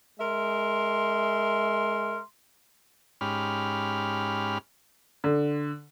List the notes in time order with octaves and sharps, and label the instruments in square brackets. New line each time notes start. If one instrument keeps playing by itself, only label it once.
[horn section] G#3 A#4 E5 C6
[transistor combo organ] G#2 C#4 G4 B5 F6
[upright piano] D3